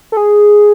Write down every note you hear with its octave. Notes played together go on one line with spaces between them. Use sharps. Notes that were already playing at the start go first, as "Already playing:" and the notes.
A4
G#4